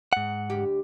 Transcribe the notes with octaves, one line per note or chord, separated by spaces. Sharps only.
G#2 F#5
D2 G4